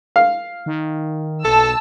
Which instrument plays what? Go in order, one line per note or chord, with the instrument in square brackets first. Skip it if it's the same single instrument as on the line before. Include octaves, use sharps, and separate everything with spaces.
[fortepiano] F5
[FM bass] D#3
[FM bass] B1 [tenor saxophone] A4 [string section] A5 E6